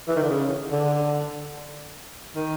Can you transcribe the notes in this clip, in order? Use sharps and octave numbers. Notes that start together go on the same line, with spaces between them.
E3
D#3
D3
C#3
D3
D#3